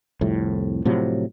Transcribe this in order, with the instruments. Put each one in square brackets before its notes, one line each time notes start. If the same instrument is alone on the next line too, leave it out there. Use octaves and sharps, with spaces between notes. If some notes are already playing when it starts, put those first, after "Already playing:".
[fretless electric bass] C2 F2 A2
A2 C3 F3 F#3